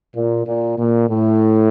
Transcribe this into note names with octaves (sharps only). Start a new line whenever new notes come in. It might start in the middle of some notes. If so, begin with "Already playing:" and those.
A#2
A#2
A#2
A2